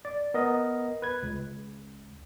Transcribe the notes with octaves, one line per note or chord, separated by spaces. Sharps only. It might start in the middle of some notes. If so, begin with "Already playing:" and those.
D5
B3 A#4 D#5
B4 G#6
C#2